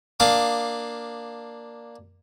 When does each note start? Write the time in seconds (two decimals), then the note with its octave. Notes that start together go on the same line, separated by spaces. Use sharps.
0.20 A#3 D4 F5 D6 D#6